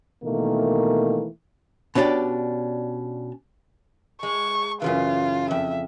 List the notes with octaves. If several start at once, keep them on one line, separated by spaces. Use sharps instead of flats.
B2 D#3 E3 A3 A#3
B2 C#4 D4 G4 D5
G#3 C#6
F#2 C#3 E3 F4
F2 E5